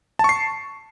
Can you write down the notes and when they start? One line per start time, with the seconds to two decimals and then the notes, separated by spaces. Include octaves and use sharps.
0.19 A5
0.24 C#6
0.29 C7